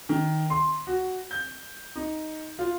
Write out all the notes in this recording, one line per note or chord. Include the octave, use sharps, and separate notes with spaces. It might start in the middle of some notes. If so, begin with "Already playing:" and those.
D#3
C6
F#4
G6
D#4
F4